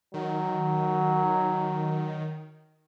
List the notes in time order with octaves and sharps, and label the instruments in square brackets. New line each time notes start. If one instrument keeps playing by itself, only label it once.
[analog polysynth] D#3 [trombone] F#3